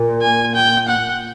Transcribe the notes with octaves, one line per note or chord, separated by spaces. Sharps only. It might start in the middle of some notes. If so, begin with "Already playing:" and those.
Already playing: A#2
G#5
G5
F#5